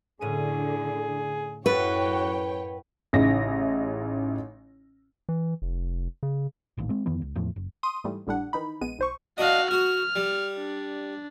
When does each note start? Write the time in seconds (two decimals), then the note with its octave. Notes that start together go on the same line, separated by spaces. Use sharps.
0.21 A2 D3 C#4 G#4 D#7
1.66 F#2 E4 F#4 A4 B4 C#5 F#5 G5
3.13 A1 C#3 D#4 E4 A#6
5.29 E3
5.62 F1
6.23 C#3
6.77 D#1 A1 D#2
6.89 G#3 C4
7.06 F2 D#3 E3 B3
7.22 C#2
7.35 E2 A2 F3
7.56 F#1
7.83 C6 D#6 D#7
8.04 G#2 E3 G3 A3
8.27 G#1 A2 D3 G3 D4 F#5
8.53 D#3 E3 D#4 B5
8.81 A#1 G#3 B3 D#7
8.99 B1 C5 C#6
9.38 D4 F#4 D#5 F5
9.71 F#4 F6
10.16 G3
10.57 D4